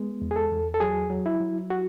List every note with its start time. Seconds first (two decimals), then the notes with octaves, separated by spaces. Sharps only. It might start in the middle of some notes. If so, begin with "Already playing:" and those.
Already playing: G#3 B3
0.22 E2
0.31 G#4
0.36 A4
0.51 E2
0.74 A4
0.80 F#3 G#4
1.10 F#3
1.26 E4
1.40 F#3
1.70 F#4